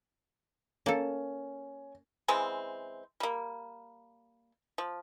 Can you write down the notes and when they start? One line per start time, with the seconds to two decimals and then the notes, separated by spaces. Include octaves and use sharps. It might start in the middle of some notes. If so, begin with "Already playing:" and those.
0.86 A#3 C#4 A4
2.28 C#3 E3 G#3 C4
3.20 G3 A#3
4.78 F3